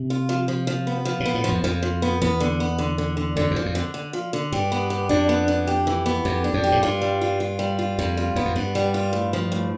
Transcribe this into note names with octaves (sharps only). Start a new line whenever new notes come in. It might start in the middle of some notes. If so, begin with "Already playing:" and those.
Already playing: C3
F4
F3
F3
F3
B3
F3
B2
B3
A2
F2 F3
F2 F3
F3
B3
E2 B3
D3
B3
D3
D3
D3
F2 D3
E2
F3
F2
D3
D3
F3
D3
G2 G4
B3
G4
F2 D4
B3
D4
G4
E3
B3
F2 G4
D4
F2
G4
A2
G2 F4
G3
F4
F4
G3
F4
F2 G3
F4
E2 B3
F2
G2 B3
G3
F4
A2
F3
A2